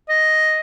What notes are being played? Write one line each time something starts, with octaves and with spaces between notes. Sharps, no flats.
D#5